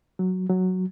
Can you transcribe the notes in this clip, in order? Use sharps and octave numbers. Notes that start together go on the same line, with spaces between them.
F#3
F#3